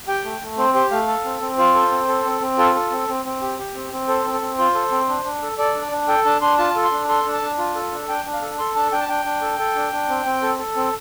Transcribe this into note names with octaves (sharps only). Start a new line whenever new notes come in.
G4 G5
A3
A3
C4 C5
G4 C5
A3 F5
A4
C4
C4
F4 C5
A4
C4
A4
C4
C4
F4 A4
A4
C4
C4
C4
G4
G4
C4
C4
A4 C5
C4
A4
C4
F4 C5
A4
C4
D4
D4
A4
A4 D5
D4
D4
A4 G5
D4 A5
D4 C6
F4 A5
A4
C6
D4
A4 C6
D4
A5
D4
F4
A4
D4
D4 G5
D4
F5
A4
A4 C6
D4 A5
D4 G5
A5
D4 G5
D4
A4
A4
D4
D4
C4
C4
A4
A4
C4